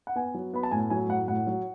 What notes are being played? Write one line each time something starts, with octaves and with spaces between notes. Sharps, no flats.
F#5
B3 G#5
F#3
B3 B5
A5
A2 G#5
F#3 G#5
A2 F#5
A2 F#5
F#3